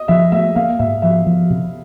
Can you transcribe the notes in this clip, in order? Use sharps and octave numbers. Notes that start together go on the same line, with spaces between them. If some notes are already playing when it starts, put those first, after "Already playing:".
Already playing: D#5
F3 E5
A3 E5
A#3 F5
G#2 E5
F3 E5
F3
C3